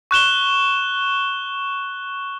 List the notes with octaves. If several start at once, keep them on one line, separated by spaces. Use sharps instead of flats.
C#6 F#6 E7 G7